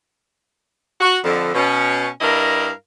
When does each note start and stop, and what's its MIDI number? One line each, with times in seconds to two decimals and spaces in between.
1.01 1.18 66
1.24 1.50 41
1.24 1.50 50
1.54 2.08 47
1.54 2.08 61
2.21 2.69 43
2.21 2.69 62
2.21 2.69 64
2.21 2.69 70
2.21 2.69 75
2.21 2.69 77